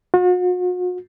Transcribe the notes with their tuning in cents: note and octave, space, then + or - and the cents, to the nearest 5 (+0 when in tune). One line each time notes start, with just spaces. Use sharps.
F#4 -40